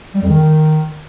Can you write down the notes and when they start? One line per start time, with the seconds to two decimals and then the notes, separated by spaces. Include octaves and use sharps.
0.14 G3
0.21 F2
0.29 D#3